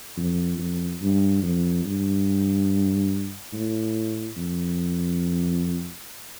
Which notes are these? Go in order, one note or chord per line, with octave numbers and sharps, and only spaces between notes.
F2
F2
G2
F2
G2
A2
F2